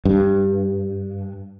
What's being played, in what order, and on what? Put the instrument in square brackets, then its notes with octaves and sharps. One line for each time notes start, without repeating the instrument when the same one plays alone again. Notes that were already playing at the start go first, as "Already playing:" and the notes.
[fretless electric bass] G2